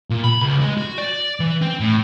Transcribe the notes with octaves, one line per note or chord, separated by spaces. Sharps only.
A#2
B5
C#2
G#3
F#4
D5
E3
C4
A2